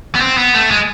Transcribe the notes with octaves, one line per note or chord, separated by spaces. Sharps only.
B3
C4
B3
A3
G#3